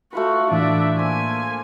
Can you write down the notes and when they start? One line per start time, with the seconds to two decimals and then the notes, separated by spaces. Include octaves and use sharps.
0.13 A3 F4 F#4 B4
0.51 A2 E3 D4 E5
0.99 A#3 C5 G#5